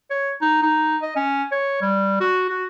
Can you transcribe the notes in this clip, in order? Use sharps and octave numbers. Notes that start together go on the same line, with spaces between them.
C#5
D#4
D#4
D#5
C#4
C#5
G3
F#4
F#4